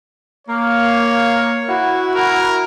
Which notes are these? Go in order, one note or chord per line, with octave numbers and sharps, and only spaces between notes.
A#3 C#5
E4 F#4
A#4